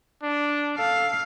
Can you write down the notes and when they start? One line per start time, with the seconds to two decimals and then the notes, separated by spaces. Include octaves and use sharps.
0.23 D4
0.78 A4 F5